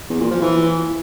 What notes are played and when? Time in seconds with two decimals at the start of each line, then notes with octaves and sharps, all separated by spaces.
0.10 E2
0.20 A#2
0.31 F3
0.42 E3